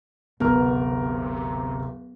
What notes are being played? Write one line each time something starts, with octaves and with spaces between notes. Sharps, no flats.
D1 G1 C3 B3 A#4 F6